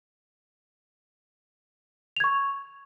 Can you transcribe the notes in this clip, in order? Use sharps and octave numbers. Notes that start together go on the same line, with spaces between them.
C#6 G#6 F7